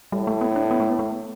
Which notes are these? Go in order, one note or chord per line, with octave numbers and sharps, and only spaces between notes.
A2 G3
A3
B3
D4
B3
A3
B3
A3